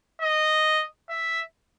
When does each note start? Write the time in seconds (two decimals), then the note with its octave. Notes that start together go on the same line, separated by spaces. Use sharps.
0.21 D#5
1.09 E5